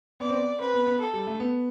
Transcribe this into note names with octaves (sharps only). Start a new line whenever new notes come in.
B3 D5
C4
B3
C4 B4
B3
B3
A4
G3
A3
B3